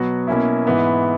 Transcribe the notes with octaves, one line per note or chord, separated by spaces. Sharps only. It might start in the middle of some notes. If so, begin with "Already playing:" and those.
Already playing: B2 F#3 B3 F#4
B2 A#3 C#4 E4
G#2 E3 B3 E4